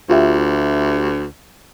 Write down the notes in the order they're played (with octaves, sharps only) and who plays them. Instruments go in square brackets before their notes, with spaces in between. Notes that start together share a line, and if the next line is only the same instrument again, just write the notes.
[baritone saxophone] D2 [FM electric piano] F4 G4 E5